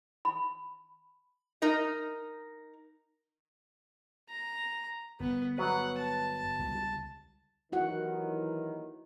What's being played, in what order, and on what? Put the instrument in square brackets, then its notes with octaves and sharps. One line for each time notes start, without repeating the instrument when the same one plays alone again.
[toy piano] B5
[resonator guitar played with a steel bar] D#4 A#4 D#5
[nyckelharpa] A#5
[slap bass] G1 [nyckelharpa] B3
[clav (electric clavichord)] F#3 B3 B4 [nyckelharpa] F#5
[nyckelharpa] A5
[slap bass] C#2 G3
[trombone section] D#2 D#3 [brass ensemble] E3 F#3 [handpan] E4 F#4 F#5